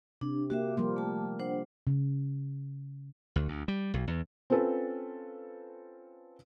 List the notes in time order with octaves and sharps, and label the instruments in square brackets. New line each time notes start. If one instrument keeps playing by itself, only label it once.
[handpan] C3 [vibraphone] D4
[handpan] A#3 G4 [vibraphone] F#4 E5
[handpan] F3 G3 A#3 [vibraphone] C6
[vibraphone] A3 A5
D4 C5 F#5
[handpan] C#3
[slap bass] D2
D2
G3
B1
E2
[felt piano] C4 C#4 F4 A4 B4